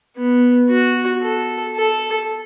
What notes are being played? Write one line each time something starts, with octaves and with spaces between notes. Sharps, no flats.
B3
F#4
A4
A4